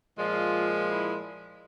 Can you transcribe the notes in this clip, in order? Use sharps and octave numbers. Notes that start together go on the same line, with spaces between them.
A#2 F3 G#3 F4
E4